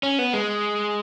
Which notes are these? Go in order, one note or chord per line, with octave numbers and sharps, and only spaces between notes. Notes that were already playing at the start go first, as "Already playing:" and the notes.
C#4
B3
G#3